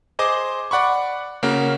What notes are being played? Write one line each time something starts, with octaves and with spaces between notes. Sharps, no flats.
G#4 C5 D#5 C6 D6
D5 F#5 B5 C#6
C#3 A#3 C#4 F#4